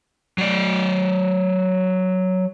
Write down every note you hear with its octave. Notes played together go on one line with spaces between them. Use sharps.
F#3 D5